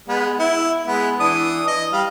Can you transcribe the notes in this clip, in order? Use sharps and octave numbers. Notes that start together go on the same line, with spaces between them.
G#3 B3
E4
G#3 B3
E3 D4 D#6
D#5
G3 F5